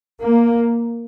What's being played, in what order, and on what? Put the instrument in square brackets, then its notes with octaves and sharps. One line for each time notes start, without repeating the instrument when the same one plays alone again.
[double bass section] A#3